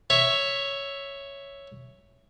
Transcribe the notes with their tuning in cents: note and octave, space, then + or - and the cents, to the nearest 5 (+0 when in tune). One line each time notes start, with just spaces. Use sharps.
C#5 +0 E5 +0